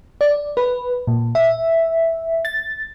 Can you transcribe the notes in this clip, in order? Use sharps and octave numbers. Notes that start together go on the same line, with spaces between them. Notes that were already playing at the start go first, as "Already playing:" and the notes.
D5
B4
A#2
E5
A6